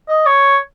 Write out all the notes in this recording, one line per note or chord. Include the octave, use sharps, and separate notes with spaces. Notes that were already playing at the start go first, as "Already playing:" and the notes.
D#5
C#5